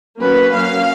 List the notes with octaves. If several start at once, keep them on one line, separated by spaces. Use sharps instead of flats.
F#3 A#3 C#4 B4
F#3 A#3 C#4 F5